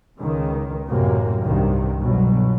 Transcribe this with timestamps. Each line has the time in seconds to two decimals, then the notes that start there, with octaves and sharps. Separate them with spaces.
0.19 C#2 D#3
0.90 A1 F#2 C3 A#3
1.46 C2 G2 C3 D#3
2.02 G1 B2 F#3